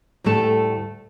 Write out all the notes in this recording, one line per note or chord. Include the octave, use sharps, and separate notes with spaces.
D2 A2 G3 A3 A5